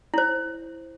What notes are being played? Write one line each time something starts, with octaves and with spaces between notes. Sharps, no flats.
E4 C5